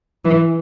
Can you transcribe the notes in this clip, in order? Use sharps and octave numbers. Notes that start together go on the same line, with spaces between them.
E3